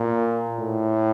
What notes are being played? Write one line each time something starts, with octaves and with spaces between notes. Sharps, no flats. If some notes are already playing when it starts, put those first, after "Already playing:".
Already playing: A#2
A2